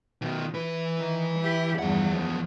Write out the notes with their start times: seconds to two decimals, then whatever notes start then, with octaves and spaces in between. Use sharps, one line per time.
0.22 B2 D#3
0.54 E3 B4
0.99 D#3
1.39 E4 G4
1.79 E2 G2 F3 F#5
2.13 F#2 F3 B3